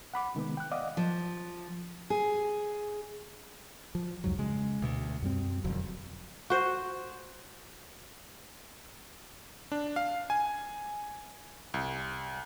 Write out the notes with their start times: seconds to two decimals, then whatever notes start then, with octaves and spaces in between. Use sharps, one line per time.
0.14 F#5 B5 D6
0.35 C3 D#3 G#3 B3
0.57 G5 F#6
0.72 D5 D#5 F5 F#5 D6 D#6
0.97 F3
2.10 G#4
3.95 F3
4.24 C2 F2 G#2 F#3
4.39 C#3 G#3
4.82 D2 B2
5.22 F#2 G3 C4
5.64 E1 F2 D3 F#3
6.50 F#4 C5
9.72 D4
9.96 F5
10.30 G#5
11.74 C2